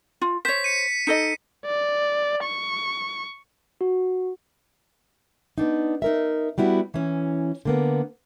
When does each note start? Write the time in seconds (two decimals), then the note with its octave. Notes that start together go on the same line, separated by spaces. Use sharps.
0.21 F4
0.45 C5 C#5 B6
0.64 C#7 D#7
1.07 D#4 A4 D#5 C#7
1.66 D5
2.43 C#6
3.81 F#4
5.58 B3 D4 D#4
6.02 D#4 A#4 E5
6.58 G3 B3 E4 F#4
6.94 E3 C#4
7.65 D3 A#3 B3